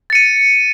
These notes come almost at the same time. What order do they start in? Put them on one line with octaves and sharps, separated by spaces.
A6 C#7 D#7